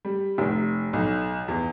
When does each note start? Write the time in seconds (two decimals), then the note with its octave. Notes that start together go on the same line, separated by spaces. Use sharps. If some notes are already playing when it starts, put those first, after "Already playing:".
0.05 G3
0.38 F1
0.93 B1
1.48 E2